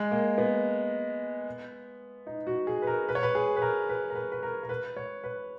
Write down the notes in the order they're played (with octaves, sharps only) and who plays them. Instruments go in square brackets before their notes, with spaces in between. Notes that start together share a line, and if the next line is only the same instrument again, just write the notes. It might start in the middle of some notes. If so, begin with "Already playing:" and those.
Already playing: [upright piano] G#3
A#3
B3
D#4
F#4
G#4
B4
A#4
B4
C#5
B4
G#4
B4
A#4
B4
A#4
B4
B4
A#4
A#4
B4
C#5
B4